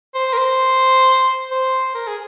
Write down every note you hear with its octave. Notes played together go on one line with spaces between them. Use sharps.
C5
A#4
C5
C5
A#4
G#4